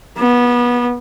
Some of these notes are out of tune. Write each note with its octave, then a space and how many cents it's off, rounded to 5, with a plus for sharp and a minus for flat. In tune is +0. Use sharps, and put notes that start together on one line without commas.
B3 -25